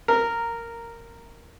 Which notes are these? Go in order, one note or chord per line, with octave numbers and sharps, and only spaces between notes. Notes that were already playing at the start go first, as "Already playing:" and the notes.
A#4